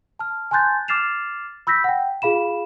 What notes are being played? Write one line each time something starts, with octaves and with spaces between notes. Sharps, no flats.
A5 F6
G#5 A5 C6 F#6 G6 A6
D6 F6 A6 C7 E7 F7
B5 E6 G6 A#6 B6
F#5 G5
F4 G#4 F5 B5 E7